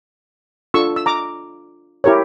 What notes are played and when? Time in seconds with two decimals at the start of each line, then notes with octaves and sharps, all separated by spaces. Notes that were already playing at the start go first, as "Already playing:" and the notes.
0.74 D4 F4 A4 C#6 E6
0.96 E6
1.06 A#5 D6
2.04 E4 G4 A#4 C#5